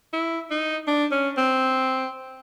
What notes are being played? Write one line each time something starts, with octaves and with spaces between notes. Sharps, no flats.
E4
D#4
D4
C#4
C4